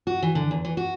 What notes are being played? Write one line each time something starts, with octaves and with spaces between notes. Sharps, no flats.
F#4
E3
D3
E2
E3
F#4